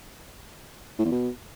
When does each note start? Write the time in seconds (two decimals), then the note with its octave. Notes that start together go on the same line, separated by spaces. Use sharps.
0.99 A2
1.05 E2
1.12 B2